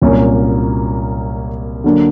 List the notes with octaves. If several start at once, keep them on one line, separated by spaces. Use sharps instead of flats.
C2 A#2 F#3 A#3 C#4
D3 F#3 A#3 D4